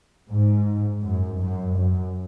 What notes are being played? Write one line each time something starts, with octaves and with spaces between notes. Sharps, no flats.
G#2
F#2
F#2
F#2